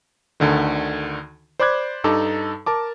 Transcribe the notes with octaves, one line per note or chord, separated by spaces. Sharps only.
D2 D3 D#3
C5 D5 B5 D6 F#6 G#6
G2 D#4 A4 A5 D6
A#4 A5 D6